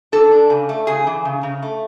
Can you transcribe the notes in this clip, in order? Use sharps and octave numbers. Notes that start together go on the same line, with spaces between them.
D4 A4
D4
C#3
A3
C#3 G#4
E3
C#3
C#3
A3